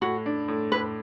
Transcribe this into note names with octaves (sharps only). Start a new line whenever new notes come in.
A2 F#4
D4
A2
A2 B4